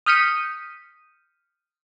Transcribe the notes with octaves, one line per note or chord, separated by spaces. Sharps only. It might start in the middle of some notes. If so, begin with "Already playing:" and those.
D#6 F6 G6 B6 C#7 D#7